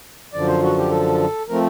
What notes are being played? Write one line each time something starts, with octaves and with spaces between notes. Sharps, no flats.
F#2 D3 F3 D5
C5
F#4
G4
A4
F3 A3 C4 A#4